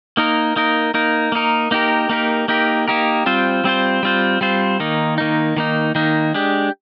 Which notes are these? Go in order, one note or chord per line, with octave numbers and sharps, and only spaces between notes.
A#3 D#4 A#4
A#3 D#4 A#4
A#3 D#4 A#4
A#3 D#4 A#4
A#3 D#4 G4 A#4
A#3 D#4 G4 A#4
A#3 D#4 G4 A#4
A#3 D#4 G4 A#4
G3 C4 F4 C5
G3 C4 F4 C5
G3 C4 F4 C5
G3 C4 F4 C5
D#3 A#3 D#4
D#3 A#3 D#4
D#3 A#3 D#4
D#3 A#3 D#4
G#3 D4 G4